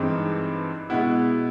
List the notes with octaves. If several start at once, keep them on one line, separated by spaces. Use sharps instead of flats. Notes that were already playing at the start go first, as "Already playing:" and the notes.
Already playing: G2 E3 G#3 C4 D#4
B2 G#3 B3 E4